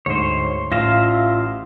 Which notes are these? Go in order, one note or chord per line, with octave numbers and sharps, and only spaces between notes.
D2 G#2 C5 C#5
A1 F4 E5 F5 A#6